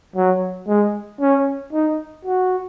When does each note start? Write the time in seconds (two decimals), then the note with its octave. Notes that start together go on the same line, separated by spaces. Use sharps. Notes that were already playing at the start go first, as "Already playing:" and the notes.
0.16 F#3
0.68 G#3
1.21 C#4
1.73 D#4
2.25 F#4